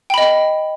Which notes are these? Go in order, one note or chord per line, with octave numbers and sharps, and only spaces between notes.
D#5 G5 B5